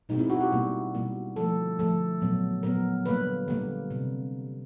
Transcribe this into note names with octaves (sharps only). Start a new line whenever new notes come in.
B2 G#3 C4 D#4
E4
F#4
G4
B2 G3 A#3
B2 G3 A#3
D3 F3 A3 A4
D3 F3 A3 A4
A#2 F#3 B3
A#2 F#3 B3 A#4
D3 G3 A#3 B4
D3 G3 A#3
C3